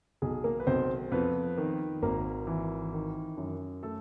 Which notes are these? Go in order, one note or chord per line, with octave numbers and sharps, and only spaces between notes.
B1 G#4
A#3 A#4
B4
B1 C4 C5
F2 B3 B4
D#3
G#1 A#3 A#4
E3
D#3
F#2
A3 A4